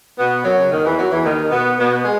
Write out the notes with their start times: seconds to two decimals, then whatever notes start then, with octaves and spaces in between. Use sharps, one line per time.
0.17 B2 B3
0.43 F#2 F#3
0.57 C#3
0.70 D#2 D#3
0.83 E2 E3
0.97 F#2 F#3
1.09 E2 E3
1.23 D#2 D#3
1.50 B2 B3
1.76 B2 B3
2.03 G#3